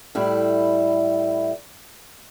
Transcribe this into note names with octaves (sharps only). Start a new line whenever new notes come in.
A2 G3 E4